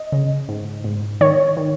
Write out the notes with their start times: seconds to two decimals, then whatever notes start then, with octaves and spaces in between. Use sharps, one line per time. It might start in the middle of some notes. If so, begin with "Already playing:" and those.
Already playing: D#5
0.12 C#3
0.49 G#2
0.84 G#2
1.21 D#3 C#5
1.57 D#3